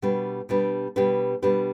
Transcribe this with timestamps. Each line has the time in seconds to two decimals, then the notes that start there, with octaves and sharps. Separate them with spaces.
0.02 B2 G3 D4 G4 B4
0.49 B2 G3 D4 G4 B4
0.96 B2 G3 D4 G4 B4
1.42 B2 G3 D4 G4 B4